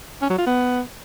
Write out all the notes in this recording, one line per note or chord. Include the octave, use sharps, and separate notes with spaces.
C#4
F#3
F4
B3